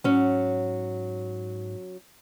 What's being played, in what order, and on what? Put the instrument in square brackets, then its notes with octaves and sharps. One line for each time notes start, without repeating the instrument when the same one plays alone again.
[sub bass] G#2 [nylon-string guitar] F#3 C#4